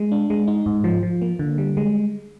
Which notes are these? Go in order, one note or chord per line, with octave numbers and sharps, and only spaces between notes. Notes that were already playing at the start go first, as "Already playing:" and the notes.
Already playing: G#3
D4
G#3
D#4
G#2
F3
F3
A#3
D3
G3
G#3